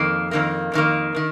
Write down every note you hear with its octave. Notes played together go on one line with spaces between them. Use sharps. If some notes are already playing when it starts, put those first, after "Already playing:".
Already playing: F2 D#3 A#3
F2 D#3 A#3
F2 D#3 A#3
D#3